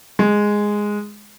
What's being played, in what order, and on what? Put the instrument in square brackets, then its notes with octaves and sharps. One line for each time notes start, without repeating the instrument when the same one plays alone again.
[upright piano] G#3